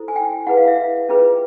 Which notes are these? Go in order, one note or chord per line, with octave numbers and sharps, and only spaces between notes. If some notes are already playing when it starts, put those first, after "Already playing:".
Already playing: E4 A4 C5
G#5
G5
E4 G#4 B4 F#5
F5
E5
C#4 F4 G#4 B4